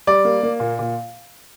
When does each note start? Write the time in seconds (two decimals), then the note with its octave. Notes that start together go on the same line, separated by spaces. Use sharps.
0.07 G3 D5
0.25 A#3
0.43 A#3
0.60 A#2
0.79 A#2